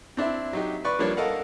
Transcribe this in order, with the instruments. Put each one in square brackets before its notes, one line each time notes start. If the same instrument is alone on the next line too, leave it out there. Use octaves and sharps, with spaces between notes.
[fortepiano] C4 D4 E4 E5
F#3 D#4 G4
B4 D5 C#6
F3 G3 A#3 D4 C#5
A4 A#4 D#5 F5 F#5